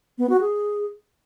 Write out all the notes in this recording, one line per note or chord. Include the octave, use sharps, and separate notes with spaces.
B3
F#4
G#4